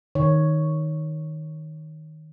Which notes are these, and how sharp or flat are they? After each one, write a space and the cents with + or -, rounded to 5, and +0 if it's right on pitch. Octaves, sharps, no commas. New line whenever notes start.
D#3 +0 C#5 +0